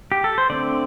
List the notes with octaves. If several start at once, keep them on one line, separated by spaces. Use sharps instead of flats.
G4
A4
C5
D3 A3 C4 D5